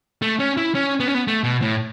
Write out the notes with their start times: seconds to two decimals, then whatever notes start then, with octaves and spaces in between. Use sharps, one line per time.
0.22 A3
0.40 C#4
0.57 E4
0.75 C#4
1.00 B3
1.08 C#4
1.15 B3
1.27 A3
1.44 B2
1.62 A2